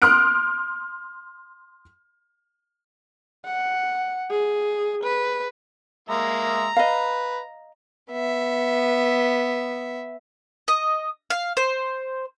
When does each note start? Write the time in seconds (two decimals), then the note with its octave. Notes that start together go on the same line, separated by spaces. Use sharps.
0.02 C6 D#6 F6 F#6 D7
3.45 F#5
4.31 G#4
5.04 B4
6.09 G#3 A#3 E5 A#5
6.77 B4 D#5 F5
8.11 B3 E5
10.68 D#5
11.30 F5
11.57 C5